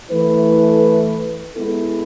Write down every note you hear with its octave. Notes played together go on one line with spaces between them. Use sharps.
E3 A3 E4 B4
G#3 B3 E4 A4